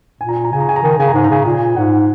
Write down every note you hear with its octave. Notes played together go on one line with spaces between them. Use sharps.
A#2 G#5
A#5
G#5
A#5
C#3 G#5
A#5
G#5
A#5
D#3 G#5
A#5
C#3 G#5
A#5
G#2 G#5
A#5
C#3 G#5
A#2 G#5
G#2 F#5